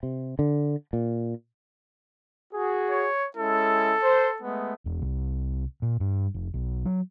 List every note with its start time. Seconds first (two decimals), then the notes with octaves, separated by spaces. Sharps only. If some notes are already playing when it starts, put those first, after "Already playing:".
0.03 C3
0.39 D3
0.93 A#2
2.53 F#4 G#4
2.90 C#5
3.37 G#3 C#4 E4 A4
4.03 C5
4.42 G#3 A3 B3
4.86 E1
5.02 C2
5.82 A#2
6.00 G2
6.35 F1
6.54 B1
6.85 F#3